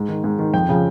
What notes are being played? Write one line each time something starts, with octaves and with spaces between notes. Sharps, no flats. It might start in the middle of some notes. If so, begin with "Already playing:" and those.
Already playing: G#2
D#3
G#2
D#3
F2 G5
C#3 F3